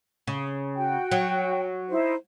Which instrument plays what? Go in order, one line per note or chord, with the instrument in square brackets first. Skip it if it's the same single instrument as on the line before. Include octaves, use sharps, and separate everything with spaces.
[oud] C#3
[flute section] F#4 G5
[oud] F#3
[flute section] D#4 E4 C5